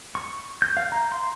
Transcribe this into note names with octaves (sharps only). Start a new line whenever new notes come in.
C#6
G6
F5
A#5
C6